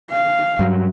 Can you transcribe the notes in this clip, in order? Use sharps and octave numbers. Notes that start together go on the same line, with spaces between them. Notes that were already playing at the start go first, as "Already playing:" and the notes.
F5
G2 F#3